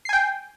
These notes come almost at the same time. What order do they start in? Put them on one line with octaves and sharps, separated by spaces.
C7 G#5 G5